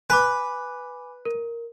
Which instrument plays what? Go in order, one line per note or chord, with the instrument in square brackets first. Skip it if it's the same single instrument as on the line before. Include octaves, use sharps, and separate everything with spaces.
[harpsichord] B4 [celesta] G#5 B5 D6
[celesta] A#4